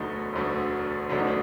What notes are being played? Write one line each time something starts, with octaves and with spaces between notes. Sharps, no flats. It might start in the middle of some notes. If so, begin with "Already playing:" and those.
Already playing: E1 D2 D3 F#3 A3 D#4
E1 D2 D3 F#3 A3
E1 D2 D3 F#3 A3 D4
D#4
D4